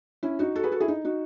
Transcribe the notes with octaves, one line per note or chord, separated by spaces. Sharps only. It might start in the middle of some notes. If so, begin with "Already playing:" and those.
C#4 E4
D#4 F#4
F#4 A4
G#4 B4
F#4 A4
E4 G#4
D#4
D#4 F#4